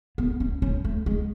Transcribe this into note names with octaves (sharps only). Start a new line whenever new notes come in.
B3
C#4
C#4
A3
G#3